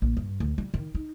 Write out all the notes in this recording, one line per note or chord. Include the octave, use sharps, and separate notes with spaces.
A#1
G2
D2
G3
D#3
D#4